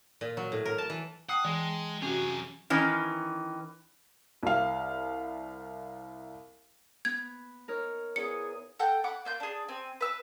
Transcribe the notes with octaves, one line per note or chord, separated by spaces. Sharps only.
A#2
F#3
A2
A#4
A5
E3
F#5 G5 A5 D#6 C7
E3 G#3
C3 F#3 C#4 F#4 G#4
D#3 E3 C#4
C2 F5
B3 G#6
D#4 A#4 C#5
E2 B3 G#4 C#7
A4 F#5 G5
F#5 B5 D6
A#3 F4 G6
D4 G#4
C4 G#5
B4 E6